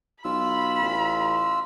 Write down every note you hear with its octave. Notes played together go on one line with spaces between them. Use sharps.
B1 F4 B5 E6
A1